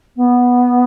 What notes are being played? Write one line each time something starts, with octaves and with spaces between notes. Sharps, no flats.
B3